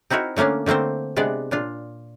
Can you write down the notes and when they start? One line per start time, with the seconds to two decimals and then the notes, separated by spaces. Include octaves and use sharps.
0.10 C4 D#4 E4 F#4 A#4
0.36 D3 A3 A#3 C#4 D4
0.66 D3 A3 A#3 C4 C5
1.16 C3 G#3 B3 D4 D5
1.51 A#2 D4 F4